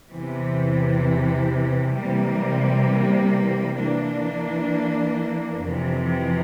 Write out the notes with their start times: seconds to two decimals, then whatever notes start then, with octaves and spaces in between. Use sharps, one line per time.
0.10 E2 C3 E3
1.94 C3 E3 G3 A#3
3.78 E3 A#3 D4
5.61 F2 C3 E3